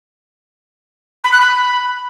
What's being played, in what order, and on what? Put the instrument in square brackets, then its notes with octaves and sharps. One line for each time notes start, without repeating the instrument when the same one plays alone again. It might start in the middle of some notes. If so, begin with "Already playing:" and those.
[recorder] B5
F#6
B5